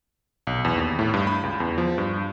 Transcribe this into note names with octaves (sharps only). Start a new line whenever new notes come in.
B1
E2
D#2
A2
G2
B5
C#2
E2
F3
G2